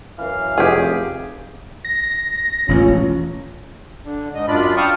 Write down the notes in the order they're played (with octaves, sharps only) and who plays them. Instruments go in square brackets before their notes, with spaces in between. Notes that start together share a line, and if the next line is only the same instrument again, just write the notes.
[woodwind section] F#2 E3 F5
[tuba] F1 [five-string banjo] G4 G#4
[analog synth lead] A#6
[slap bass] E1 A1 [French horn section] C#4 F4
[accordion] D3
G#2 D#5
F#2 D4 F4 D5 B5
F5 G5 A5 C#6 D#6 F6